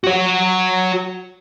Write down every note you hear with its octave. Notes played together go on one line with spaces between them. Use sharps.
F#4 C#5